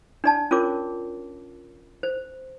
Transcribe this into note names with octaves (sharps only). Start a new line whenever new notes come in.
D4 D5 A5
C#4 F4 A#4 C#5 D6
C5